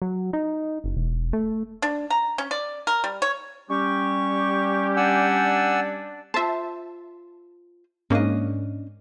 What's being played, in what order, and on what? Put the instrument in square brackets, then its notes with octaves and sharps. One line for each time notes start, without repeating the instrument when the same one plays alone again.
[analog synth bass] F#3
D#4
F#1
E1
A3
[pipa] D4
A#5
C#4
D5
A#4
G3
C#5
[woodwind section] G3 C#4 G4 [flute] C#6
[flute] D4 [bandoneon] F#5 G#5 E6
[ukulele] F4 C5 [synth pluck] E5 A5
[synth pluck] G#2 A#3 [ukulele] C#4 D4 D#5